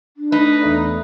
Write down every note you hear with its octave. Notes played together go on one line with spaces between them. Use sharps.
D4
A3 D#4 B4
E2 A3 D5